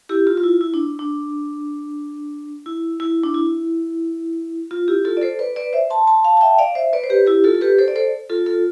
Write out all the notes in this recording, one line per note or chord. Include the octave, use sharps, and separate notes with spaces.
E4 G4
F4
F4
E4
E4
D4
D4
E4
E4
D4
E4
F4
E4 G4
F4 A4
D5
A4 C5
B4 D5
B4 D5
C5 E5
A5 C6
A5 C6
F5 A5
A5
E5 G5
D5 F5
C5 E5
B4 D5
C5
G4 B4
E4 G4
F4 A4
A4
G4 B4
A4 C5
D5
A4 C5
F4 A4
F4 A4